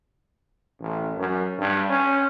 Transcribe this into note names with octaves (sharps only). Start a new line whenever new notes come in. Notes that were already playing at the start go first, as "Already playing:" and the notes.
A1
F#2
G2
C#4